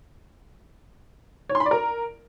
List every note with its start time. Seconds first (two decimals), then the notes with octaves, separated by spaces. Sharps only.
1.49 C#5
1.55 C6
1.60 B5
1.66 D5
1.71 A#4